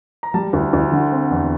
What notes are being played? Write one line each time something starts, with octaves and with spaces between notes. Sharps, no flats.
A#5
G3 A5
D2
D2
D3
C4
E2